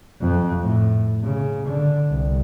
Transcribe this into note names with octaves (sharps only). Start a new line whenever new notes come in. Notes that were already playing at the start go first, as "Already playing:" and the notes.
F2
A2
C#3
D3
C2